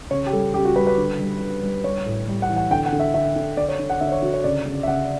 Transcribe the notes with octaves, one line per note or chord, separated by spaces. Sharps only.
C#3 C#5
G4
G3 A4
C#3 G4
F#4
G3 B4
B4
D3
G3
D3
G3
G3 C#5
A2
G3
F#5
E3
F#5
D3 G5
F#5
D3
E5
D3 E5
D3
D3 D5
C#5
D3
F#5
D3 E5
D5
C#5
D3 F#4
C#5
C#3 D5
C#3
E5
C#3 F#5